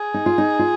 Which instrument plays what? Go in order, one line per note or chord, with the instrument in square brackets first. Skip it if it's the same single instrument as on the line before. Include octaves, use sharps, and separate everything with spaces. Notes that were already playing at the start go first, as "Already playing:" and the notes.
Already playing: [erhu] G#4
[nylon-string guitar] D#4
F4
D#4
F4